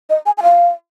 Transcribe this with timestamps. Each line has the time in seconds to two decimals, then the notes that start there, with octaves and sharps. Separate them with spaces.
0.10 D#5
0.26 G#5
0.38 G#5
0.43 F5